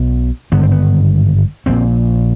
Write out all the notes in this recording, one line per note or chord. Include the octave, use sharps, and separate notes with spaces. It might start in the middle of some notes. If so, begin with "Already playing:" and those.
Already playing: B1 B2
G#1 G2 D3 B3
C4
B3
A#1 A#2 C4